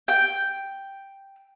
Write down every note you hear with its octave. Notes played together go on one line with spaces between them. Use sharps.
G5